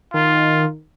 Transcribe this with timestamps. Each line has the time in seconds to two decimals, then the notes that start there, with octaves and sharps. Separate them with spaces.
0.14 D#3 F4